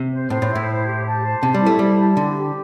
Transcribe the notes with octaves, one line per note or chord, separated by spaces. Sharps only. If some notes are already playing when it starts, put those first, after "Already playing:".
Already playing: C3
C5
A2 C5
A2
E4
A2
C5
G4
A5
C5
C3 A5
G3
E4
A3
G3 C5
A5
D3 G4
G4